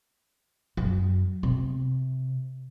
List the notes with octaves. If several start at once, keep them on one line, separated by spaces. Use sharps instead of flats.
F#2
C3